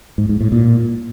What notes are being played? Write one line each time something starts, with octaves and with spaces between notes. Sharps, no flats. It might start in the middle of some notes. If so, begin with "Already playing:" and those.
G#2
G#2
A2
A#2